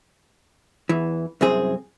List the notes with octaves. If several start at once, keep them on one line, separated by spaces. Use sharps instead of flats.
E2 E3
C2 F#2 C4 G#4